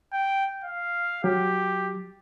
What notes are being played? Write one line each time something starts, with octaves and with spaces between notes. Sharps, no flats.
G5
F5
F#3 G4